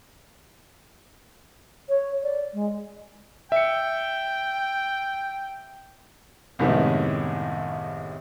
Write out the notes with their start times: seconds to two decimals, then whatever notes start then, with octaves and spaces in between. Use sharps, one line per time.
1.89 C#5
2.23 D5
2.53 G#3
3.52 E5 G5 C#7
6.59 C2 F#2 A2 D#3 G#3 B3